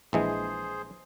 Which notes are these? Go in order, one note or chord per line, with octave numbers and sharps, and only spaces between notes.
A#1 E3 G#3 G#4 C5